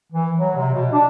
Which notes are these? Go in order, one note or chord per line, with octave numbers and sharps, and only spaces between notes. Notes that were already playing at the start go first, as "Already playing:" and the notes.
E3
F#3
C3
B2
D4